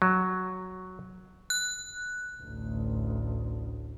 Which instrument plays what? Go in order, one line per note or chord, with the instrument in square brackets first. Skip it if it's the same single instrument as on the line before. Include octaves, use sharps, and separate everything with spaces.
[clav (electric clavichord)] F#3
[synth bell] F#6
[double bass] A1 D2